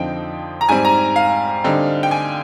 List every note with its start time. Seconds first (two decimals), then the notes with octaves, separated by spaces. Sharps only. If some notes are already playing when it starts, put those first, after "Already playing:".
Already playing: F2 D3 F3 C4 D#4 G5
0.61 A#5
0.69 G#2 G3 C4 G#5
0.85 A#5
1.16 F5
1.64 D3 G3 C4 D#4
2.03 G5
2.11 G#5